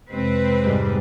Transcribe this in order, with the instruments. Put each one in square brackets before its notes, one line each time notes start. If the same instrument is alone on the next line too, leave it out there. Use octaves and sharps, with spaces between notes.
[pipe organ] F2 C3 G#3 [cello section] C4 B4
[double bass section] G#2 G3